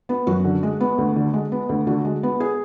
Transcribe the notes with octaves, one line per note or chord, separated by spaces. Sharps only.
B3
F#2 F#4
D3
G#3
B3
D2
D3
G#3
B3
D2
D3 F#4
G#3
B3
G#4